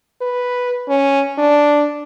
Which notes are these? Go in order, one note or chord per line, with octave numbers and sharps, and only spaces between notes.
B4
C#4
D4